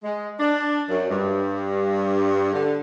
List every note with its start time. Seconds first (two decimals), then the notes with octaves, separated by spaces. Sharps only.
0.03 G#3
0.39 D4
0.90 F#2
1.10 G2
2.53 D3